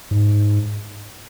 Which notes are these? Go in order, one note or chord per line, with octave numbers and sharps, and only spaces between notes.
G#2